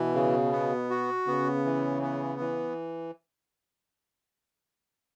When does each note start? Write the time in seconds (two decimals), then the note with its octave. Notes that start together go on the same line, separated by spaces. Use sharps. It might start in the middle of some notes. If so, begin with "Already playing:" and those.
Already playing: B2 E3
0.15 C#3
0.52 B3
0.90 F#4
1.27 C#3 B3
1.65 E3
2.02 B3
2.40 E3